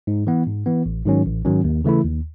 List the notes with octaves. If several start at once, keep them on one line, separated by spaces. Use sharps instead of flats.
G#2
E3 B3
G#2
E3 B3
A1
G#2 D#3 F#3 C#4
A1
G#2 D#3 F#3 C#4
D#2
C#3 E3 A3 E4
D#2